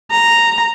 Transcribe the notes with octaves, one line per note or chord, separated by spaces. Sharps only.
A#5